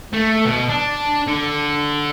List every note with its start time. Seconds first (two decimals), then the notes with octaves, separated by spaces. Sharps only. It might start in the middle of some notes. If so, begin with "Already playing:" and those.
0.13 A3
0.45 B2
0.69 D4
1.27 D3